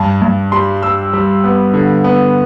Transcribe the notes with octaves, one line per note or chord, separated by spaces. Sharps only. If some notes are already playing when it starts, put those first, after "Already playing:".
Already playing: G2 A5
G2
G3 C6
G3 E6
G3
B3
D3
B3